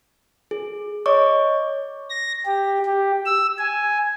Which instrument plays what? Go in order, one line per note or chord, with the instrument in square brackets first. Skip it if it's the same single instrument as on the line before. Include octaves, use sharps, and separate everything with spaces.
[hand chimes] G#4
C#5 D#5 C#6 D6
[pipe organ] A#6
G4
G4
E6
G#5